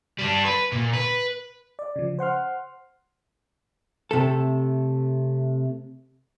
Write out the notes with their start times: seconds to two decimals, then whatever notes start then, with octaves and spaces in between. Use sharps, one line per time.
0.19 G3 D4
0.45 B4
0.72 A#2
0.93 B4
1.79 D5
1.96 C#3 F3
2.19 C5 F#5 C6 F6
4.11 C3 A3 A4